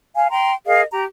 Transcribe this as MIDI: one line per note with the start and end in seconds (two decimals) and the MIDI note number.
0.15 0.27 77
0.15 0.27 80
0.30 0.52 79
0.30 0.52 82
0.30 0.52 84
0.66 0.83 68
0.66 0.83 70
0.66 0.83 75
0.66 0.83 77
0.92 1.04 67
0.92 1.04 82